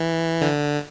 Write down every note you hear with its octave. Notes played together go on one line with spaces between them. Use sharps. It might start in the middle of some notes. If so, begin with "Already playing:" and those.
Already playing: E3
D3